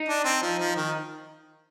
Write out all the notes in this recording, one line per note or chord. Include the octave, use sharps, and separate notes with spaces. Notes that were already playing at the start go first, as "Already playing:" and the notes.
Already playing: D#4
D4
C4
F3
F3
D#3